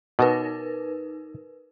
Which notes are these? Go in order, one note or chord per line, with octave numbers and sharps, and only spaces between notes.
B2 D#4 A#4 B4